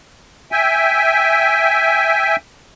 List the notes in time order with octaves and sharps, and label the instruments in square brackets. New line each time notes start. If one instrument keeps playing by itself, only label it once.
[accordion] E5 G5 G#5